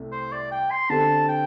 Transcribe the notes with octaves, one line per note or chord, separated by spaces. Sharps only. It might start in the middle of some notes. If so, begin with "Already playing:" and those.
Already playing: C2 C3 A3
C5
D5
G5
C6
D3 C4 G4 A5
G5